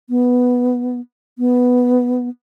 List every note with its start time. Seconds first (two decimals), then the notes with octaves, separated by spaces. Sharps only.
0.10 B3
1.39 B3